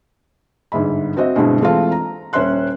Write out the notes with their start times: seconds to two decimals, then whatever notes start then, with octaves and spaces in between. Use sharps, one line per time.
0.72 G1 G#2 G#3 E5 B5
1.17 C4 F#4 C5 D#5 E5
1.35 G2 B2 D3 G#3 C4 E4
1.60 E3 G#3 A3 C4 F4
1.92 A#5
2.33 D#1 C#4 C5 E5 C6 F#6